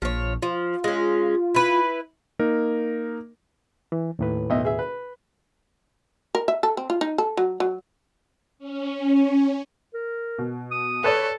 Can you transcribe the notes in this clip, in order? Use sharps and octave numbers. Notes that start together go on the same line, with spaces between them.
A#1 F3 C#5
F3 F4
G#3 C#4
E4 B4
A#3 D#4 A#4
E3
D#2 A2 B4
B1 D#5 E5
G#4 E5
B4
A#4
E5
A4
C4
F4
D#4
A4
F#3
F#3
C#4
C#4
A#4
B2
D#6
A4 B4 C#5 D5